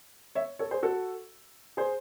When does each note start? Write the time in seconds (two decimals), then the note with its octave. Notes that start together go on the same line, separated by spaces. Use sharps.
0.35 C#5 E5
0.59 A4 C#5
0.71 G#4 C5
0.83 F#4 A4
1.77 G#4 C5